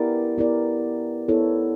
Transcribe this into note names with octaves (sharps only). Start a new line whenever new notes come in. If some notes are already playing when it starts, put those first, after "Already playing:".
Already playing: B3 E4 G4 A#4 D5
B3 E4 G4 A#4 D5
B3 E4 A4 C#5